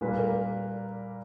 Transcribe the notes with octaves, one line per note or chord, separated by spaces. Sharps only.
A#2 G3 A#3 B4
A#4